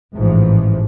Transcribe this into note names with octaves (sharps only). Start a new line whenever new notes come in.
A1 G#2 E3 F3